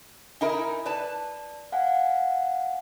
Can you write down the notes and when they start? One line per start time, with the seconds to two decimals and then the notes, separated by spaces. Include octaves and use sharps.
0.41 D#4 E4 A#4 E5 G#5
0.86 B4 D5 A5
1.72 F5 F#5 G#5